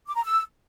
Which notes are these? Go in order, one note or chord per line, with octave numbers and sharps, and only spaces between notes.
D6
A#5
E6